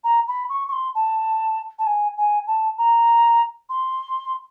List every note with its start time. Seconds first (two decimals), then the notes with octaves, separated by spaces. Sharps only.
0.04 A#5
0.28 B5
0.50 C#6
0.68 C#6
0.72 C6
0.95 A5
1.79 A5
1.87 G#5
2.18 G#5
2.47 A5
2.78 A#5
3.70 C6